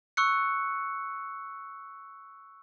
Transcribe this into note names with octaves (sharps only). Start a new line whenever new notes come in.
C#6 E6 F#6 C#7